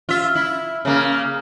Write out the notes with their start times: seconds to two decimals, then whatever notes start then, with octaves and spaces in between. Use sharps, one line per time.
0.09 F4 E5
0.35 E4
0.85 C#3 A#3